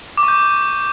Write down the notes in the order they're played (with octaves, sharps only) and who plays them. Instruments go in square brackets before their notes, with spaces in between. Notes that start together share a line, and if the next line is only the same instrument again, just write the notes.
[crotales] D6
C#6
G6